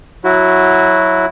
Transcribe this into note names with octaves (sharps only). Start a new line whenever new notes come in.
F#3 E4 F#4